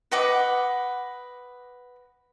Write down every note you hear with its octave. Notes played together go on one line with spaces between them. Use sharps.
B4 D#5 F#5 D6